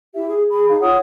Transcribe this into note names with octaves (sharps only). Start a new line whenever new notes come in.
E4 G4 E5
G#4
G#4 B5
D#4 G#4 F5
F4 C#5 F#5 D#6